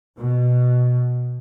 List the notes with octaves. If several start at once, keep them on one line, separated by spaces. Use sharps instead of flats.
B2